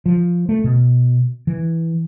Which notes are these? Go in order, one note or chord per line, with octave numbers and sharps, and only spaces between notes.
F3
A3
B2
E3